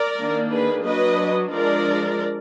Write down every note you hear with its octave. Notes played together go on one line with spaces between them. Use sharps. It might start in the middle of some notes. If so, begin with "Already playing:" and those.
Already playing: A#4 D5
D#3 A#3 D4
G#4 B4
F#3 D4 B4 D#5
F3 G#3 D4 A#4 D5